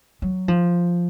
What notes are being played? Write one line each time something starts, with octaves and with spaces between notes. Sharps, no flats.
F#3
F3